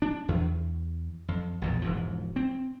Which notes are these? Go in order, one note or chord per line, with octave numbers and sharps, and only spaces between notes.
D4
E2
F2
A#1 E2 A#2
E1 G#2 F3
C4